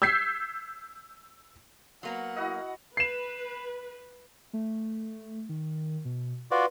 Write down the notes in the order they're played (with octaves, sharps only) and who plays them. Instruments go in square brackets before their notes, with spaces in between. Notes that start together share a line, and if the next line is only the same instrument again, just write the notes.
[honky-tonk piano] E6 G6 G#6 B6 C7
[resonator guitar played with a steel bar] F#3 A#3 B3 [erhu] F#5
[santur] E4 F#4 D#5
[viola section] B4 [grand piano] C7 E7
[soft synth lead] A3
D#3
B2
[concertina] F4 F#4 D5 [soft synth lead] B4